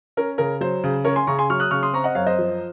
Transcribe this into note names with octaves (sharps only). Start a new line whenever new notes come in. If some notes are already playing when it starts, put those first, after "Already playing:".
C#4 A#4
C#3 A#4
F#3 C5
C#3
C#4 A#4 C#5
G#5 C6
C#3 A#5 C#6
G#5 C6
F#3 C#6 F6
D#6 F#6
C#3 C#6 F6
C6 D#6
C4 A#5 C#6
D#5 F#5
F#2 C#5 F5
C5 D#5
F3